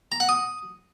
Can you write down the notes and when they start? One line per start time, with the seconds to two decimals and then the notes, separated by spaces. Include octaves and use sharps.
0.12 A#5
0.20 F#5
0.29 D#6